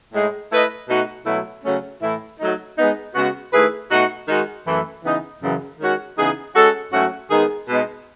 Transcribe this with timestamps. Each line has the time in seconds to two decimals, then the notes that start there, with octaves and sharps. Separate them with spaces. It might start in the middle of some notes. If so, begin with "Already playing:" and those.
0.13 A2 G#3 D#4
0.51 A3 E4 B4 D#5
0.88 B2 A3 D#4 F#4
1.25 B2 F#3 A3 E4
1.64 C#3 F#3 A3 C#4
2.02 A2 E3 A3 E4
2.39 F#3 A3 D#4
2.77 G#3 B3 D#4
3.15 C#3 G#3 B3 F#4
3.52 D#3 A3 E4 G#4 B4
3.91 B2 A3 D#4 F#4
4.28 D#3 G#3 D#4 F#4
4.66 F#2 E3 A3
5.04 C#3 E3 B3 D#4
5.42 F#2 C#3 E3
5.80 D#3 G#3 C#4 F#4
6.17 C#3 E3 B3 D#4 G#4
6.55 G#3 C#4 F#4 A4
6.92 G#2 F#3 A3 C#4 F#4
7.31 D#3 G#3 B3 D#4 G#4
7.68 B2 G#3 B3 D#4